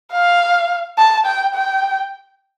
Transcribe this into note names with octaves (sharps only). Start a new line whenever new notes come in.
F5
A5
G5
G5